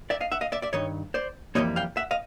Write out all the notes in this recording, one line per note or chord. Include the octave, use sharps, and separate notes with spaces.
D5 E5
D#5 F5
E5 F#5
D#5 F5
D5 E5
D5 E5
G2 D#3 C#5 D#5
C5 D5
F2 C#3 E3 G3 A#3 C#5 D#5
F5 G5
E5 F#5
D#5 F5